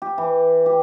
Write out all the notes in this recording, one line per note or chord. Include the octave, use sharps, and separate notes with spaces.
G4
E3
G4